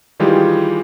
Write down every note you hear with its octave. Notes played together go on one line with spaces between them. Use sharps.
D#3 E3 G3 G#3 F4 G4